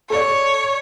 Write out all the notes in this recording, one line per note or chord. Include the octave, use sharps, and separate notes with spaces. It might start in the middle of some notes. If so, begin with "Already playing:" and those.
A4 C#5 D5